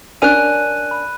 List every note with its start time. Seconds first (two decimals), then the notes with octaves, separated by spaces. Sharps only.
0.22 C#4 D4 A#4 F#6 D#7
0.91 B5